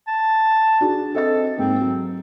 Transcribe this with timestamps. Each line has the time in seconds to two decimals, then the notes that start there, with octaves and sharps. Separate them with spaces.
0.07 A5
0.81 D4 F#4 G#4
1.15 C4 A4 D#5 A6
1.58 G#2 A#3 C4
1.81 F#3